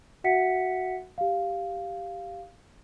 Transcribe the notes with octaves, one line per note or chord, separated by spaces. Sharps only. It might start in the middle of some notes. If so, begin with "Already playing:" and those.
F#4 E5 F#5 B6 C#7
G4 F5